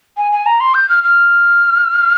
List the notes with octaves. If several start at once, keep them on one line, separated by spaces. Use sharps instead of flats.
G#5
G#5
A#5
C6
G6
F6
F6